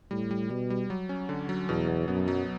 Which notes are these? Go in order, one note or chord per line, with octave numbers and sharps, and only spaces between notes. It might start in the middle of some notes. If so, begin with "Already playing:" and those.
A2 G3
G3
B2 G3
G3
F#3
C#4
D3
F#3
E2 B2
B2
F#2 B3
F#3